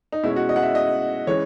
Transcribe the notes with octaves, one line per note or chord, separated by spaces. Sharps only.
D#4
B2 G#3 C#4 E4
F#4
D#5
F#5
E5
D#5
E3 G#3 C#4 C#5